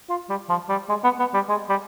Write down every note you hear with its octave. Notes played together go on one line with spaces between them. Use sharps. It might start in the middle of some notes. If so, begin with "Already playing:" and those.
F4
G3
F3
G3
G#3
B3
B3
G3
G#3
G3